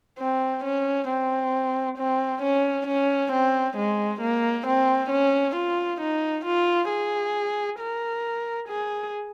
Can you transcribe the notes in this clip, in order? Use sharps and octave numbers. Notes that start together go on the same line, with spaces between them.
C4
C#4
C4
C4
C#4
C#4
C4
G#3
A#3
C4
C#4
F4
D#4
F4
G#4
A#4
G#4